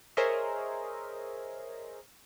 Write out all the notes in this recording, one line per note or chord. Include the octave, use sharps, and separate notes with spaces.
G#4 A#4 C5 C#5 D#5 E5